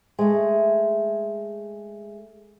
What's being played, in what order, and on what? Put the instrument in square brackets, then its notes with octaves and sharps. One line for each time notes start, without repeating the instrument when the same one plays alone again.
[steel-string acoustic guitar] G#3 A3